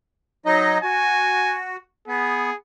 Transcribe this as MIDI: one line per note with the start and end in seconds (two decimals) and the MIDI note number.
0.46 0.78 54
0.46 0.78 63
0.46 0.78 75
0.84 1.76 66
0.84 1.58 80
2.08 2.50 59
2.08 2.55 68